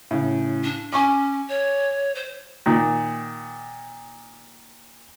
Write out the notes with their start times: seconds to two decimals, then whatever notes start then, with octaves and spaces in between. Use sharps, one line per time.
0.11 A2 C#3
0.64 D4
0.93 C#4 G#5 C#6 D6
1.48 C#5
2.15 C5
2.66 A#2 D#3